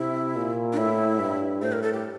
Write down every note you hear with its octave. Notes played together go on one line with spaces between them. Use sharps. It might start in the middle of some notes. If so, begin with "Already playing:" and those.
Already playing: C3 E4
A#2
D4
A2 E4
G2
A2 C5
A#4
A4
G4